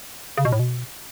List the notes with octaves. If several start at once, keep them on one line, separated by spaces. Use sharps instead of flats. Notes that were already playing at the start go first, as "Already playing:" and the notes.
C#3
B2
A2
B2